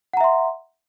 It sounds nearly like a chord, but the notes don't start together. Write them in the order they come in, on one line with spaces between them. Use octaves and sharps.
F#5 A#5 E5 C6